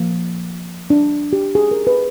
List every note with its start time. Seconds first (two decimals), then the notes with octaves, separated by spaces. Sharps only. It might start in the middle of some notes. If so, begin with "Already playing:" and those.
Already playing: F3 A#3
0.90 D4
1.33 G4
1.55 G#4
1.71 A#4
1.87 B4